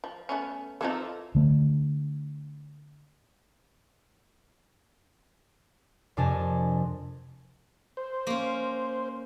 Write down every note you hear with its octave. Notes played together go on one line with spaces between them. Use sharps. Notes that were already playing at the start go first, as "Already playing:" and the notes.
F3
A3 B3 C#4
E3 F3 C4 D#4 F4 A4
D3 A3
F2 C3 D4 A#4 G#5 A5
C5
A#3 C#4